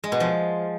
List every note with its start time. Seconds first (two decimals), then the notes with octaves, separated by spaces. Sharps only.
0.04 G#3
0.12 B2
0.20 F3